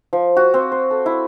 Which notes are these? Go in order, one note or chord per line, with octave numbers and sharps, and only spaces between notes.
F3
F#4
C4
C5
A4
E4